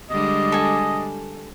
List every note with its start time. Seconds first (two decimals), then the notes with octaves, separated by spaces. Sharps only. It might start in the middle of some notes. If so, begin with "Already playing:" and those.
0.10 D3 G3 G#3 D#5
0.52 A4 G#5